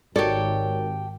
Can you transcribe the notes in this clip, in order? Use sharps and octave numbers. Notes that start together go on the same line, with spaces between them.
G#1 D#4 F#4 G4 A4 A#4 C#5 D5